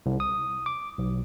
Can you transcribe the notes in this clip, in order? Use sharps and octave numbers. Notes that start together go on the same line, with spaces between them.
C2
D#6
D6
B1